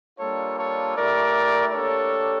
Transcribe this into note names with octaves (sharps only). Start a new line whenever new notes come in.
G3 A#3 D4 F4 A4 C#5
A4 C#5
A3 E4 G4 A#4 D5
A#3 D4 G4 A4 C#5